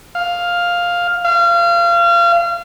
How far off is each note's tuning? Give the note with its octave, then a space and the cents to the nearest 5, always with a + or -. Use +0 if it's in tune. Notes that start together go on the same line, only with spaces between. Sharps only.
F5 +5
F5 -30